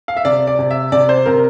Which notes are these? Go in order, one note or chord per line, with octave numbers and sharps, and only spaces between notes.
F5
E5
C3 D5
D5
C3
E5
C3 D5
C5
C3 A#4